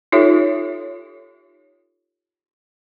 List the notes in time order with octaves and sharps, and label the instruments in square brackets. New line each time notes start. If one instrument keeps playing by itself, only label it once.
[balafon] D#4 F4 G4 A4 C#5 E5